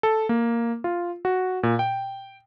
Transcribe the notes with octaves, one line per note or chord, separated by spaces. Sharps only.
A4
A#3
F4
F#4
A#2
G5